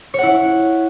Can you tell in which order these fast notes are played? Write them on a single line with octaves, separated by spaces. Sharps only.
C#5 F#5 E4